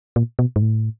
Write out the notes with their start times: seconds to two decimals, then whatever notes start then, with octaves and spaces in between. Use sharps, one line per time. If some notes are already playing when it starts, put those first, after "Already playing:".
0.16 A#2
0.39 B2
0.56 G#2
0.62 A2